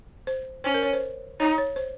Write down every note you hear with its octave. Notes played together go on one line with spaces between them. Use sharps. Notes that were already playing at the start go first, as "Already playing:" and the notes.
C5
C#4 C5
A#4
C#5
C5
D#4 C#5
C#5
C5